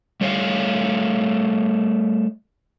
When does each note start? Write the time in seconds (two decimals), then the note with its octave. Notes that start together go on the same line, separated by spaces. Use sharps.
0.21 G3 A3 C#5 E5 F5